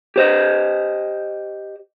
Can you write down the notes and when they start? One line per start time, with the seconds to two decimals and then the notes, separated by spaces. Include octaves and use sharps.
0.16 G4 C5 D#5